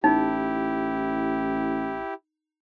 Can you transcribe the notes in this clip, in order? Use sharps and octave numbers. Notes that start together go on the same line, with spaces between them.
A1 D#4 E4 G4